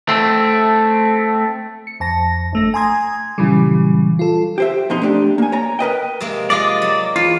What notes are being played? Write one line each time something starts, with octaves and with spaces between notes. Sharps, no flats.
A3 C4
C#7
F2 A5 A#6
G1 A3 A#6
G#5 A#5 C6 D#6 G#6
A#2 C#3 E3 F#3 G3
F4 A4
G4 C5 E5
F2 B2 D#4 C6
A3 C4 D4 G4
A#3 G#5
C#5 D5 A#5
A#4 B4 D#5 G5
C3 G#3 A#3
G#3 F4 D5 D#5
F#3
E2 F4